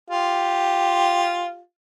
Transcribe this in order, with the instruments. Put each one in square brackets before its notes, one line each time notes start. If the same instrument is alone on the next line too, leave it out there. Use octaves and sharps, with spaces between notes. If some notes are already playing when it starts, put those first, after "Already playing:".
[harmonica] F4 G4